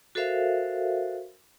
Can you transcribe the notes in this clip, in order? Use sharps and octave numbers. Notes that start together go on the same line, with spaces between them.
F#4 A4 A#4 C5 E5 F5